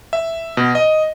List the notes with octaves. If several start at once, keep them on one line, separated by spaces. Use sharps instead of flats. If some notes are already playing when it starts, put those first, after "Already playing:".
E5
B2
D#5